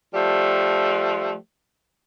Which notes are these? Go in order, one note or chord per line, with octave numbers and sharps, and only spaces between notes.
F3 G3 A3